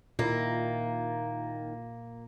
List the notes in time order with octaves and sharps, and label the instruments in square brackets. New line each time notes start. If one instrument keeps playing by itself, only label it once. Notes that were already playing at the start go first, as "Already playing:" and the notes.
[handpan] A#2 [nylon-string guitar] D#3 E4 [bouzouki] A#3